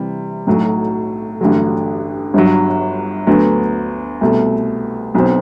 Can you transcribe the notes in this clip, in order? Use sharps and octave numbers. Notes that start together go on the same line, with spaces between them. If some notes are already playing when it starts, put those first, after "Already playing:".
Already playing: C3 E3 G3
B1 A2 F#3
A1 G2 D3 F#3
G1 G2 F#3
D2 D3 F#3 B3
C2 B2 A3
B1 B2 F#3 C4